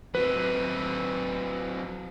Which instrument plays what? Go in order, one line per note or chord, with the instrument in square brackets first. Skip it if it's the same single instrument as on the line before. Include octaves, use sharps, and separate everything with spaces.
[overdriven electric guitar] F#3 C4 [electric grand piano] B4